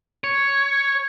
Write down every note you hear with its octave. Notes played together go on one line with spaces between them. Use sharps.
C#5